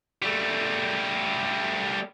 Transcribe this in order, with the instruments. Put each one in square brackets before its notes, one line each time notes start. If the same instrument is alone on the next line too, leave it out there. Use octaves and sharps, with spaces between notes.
[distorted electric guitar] G3 A3